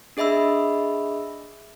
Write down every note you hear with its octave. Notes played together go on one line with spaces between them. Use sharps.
D4 G#4 D#5 E5 B5 E6